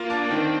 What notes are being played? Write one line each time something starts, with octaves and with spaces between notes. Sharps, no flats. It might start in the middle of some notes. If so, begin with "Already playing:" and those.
Already playing: A#3 F4
D4
D#3 C4